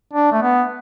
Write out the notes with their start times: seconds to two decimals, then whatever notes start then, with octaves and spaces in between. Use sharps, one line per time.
0.13 D4
0.32 A3
0.42 B3